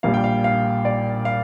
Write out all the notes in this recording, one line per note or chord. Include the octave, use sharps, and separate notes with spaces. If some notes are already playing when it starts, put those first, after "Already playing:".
A#1 A#2 G3 A#3 F5
G5
F5
F5
D5
F5